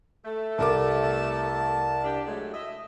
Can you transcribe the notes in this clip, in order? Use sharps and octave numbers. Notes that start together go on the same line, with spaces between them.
A3 A4
C2 A#4 A5 D6
D4 G4
F#3 G#3 A3
D#5 E5